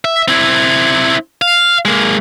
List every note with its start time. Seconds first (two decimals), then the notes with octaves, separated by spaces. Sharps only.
0.05 E5
0.28 C4 E4
1.42 F5
1.85 G#3 A#3